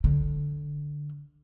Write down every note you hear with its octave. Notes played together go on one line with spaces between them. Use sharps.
D3